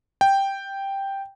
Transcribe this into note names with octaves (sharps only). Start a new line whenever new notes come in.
G5